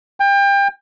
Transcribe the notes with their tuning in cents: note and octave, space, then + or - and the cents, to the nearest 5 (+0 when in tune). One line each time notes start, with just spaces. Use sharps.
G5 +30